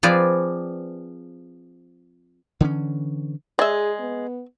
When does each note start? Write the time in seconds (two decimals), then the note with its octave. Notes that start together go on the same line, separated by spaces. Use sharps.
0.03 F3 C4 G#4 B4 D5
2.60 D3 E3 B3 C#4
3.59 G#3 G#4 D5 E5
4.00 B3